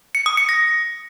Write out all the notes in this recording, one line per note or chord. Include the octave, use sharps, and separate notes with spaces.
C#7
D#6
C#7
A#6